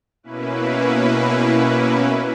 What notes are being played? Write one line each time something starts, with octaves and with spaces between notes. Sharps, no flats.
B2 A#3 C#4 E4 B4